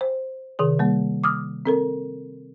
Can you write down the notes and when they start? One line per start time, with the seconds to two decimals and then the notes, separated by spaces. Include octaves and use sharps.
0.01 C5
0.59 C3 D#3 G#4
0.79 G3 A#3
1.24 D6 D#6 F6
1.66 C4 A4 A#4